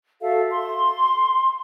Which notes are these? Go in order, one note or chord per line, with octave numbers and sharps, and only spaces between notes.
F#4 A4 E5 F5
C6